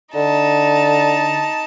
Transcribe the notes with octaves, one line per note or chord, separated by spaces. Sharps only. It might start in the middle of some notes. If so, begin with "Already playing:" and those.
D3 D#4 A5